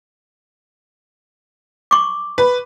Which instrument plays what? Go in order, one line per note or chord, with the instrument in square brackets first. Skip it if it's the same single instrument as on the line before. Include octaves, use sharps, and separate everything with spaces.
[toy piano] C#6 D6
[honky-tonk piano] B4